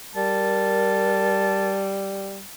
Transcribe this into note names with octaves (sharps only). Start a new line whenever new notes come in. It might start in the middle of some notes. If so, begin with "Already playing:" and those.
G3 A#4 A5